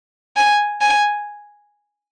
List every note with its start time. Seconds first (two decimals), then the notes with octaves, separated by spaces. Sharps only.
0.37 G#5
0.81 G#5